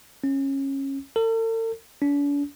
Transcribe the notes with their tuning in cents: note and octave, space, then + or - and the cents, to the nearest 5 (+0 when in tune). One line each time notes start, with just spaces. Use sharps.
C#4 -20
A4 +45
D4 -45